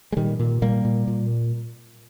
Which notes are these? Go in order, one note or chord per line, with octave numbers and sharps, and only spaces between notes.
G#3
A#2 D#3 G3
A#2
A#2 G3 A#3
A#2
A#2